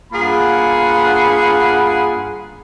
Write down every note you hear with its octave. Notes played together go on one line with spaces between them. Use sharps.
G2 A#3 F4 G#4 F#5 B5